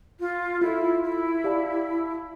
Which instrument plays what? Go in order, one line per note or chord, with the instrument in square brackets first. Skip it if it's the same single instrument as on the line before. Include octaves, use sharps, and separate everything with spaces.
[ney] F4
[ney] E4 [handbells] F4 A4 E5
[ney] E4
[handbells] G4 D5 F5 A5